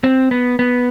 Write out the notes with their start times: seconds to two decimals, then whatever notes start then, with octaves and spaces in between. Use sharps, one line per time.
0.04 C4
0.31 B3
0.59 B3